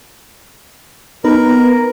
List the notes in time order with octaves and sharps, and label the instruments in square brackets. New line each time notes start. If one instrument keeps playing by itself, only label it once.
[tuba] B3 [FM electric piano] D#4 B4 [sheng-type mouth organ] A#4